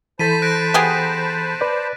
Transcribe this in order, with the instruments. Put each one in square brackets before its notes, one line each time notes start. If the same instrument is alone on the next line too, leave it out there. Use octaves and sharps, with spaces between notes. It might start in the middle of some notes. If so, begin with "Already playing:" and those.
[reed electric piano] E3 A4 [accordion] C5 A5 B5 [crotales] A6 B6 D#7
[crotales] F#6 A#6 D7
[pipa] B3 G4 G#4
[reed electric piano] B4 D5